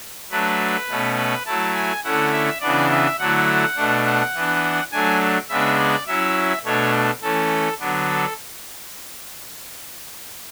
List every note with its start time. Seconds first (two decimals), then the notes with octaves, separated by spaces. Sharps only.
0.30 F#3 A3 D4 B4
0.89 B2 A3 C#4
1.17 B4
1.46 F#3 A3 E4 A5
1.75 G#5
2.04 D3 A3 C#4 E4 F#5
2.32 E5
2.61 C#3 E3 B3 D4 D5
2.90 E5
3.19 D3 F#3 A3 E4 F#5
3.76 B2 A3 D4
4.05 F#5
4.34 E3 B3 D4
4.92 F#3 A3 D4 G#5
5.49 C#3 G#3 B3 D4 E5
5.78 D5
6.07 F#3 C#4 E4 E5
6.65 B2 A3 D4 C#5
7.22 E3 A3 C#4 A4
7.79 D3 F#3 B3 D4
8.09 A4